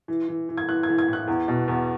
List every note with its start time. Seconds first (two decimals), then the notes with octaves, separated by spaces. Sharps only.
0.08 E3
0.28 E3
0.49 E3
0.58 G#6
0.68 E3 F#6
0.83 G#6
0.89 E3
0.99 G#6
1.08 A2
1.13 F#6
1.27 E2
1.48 B2
1.68 E2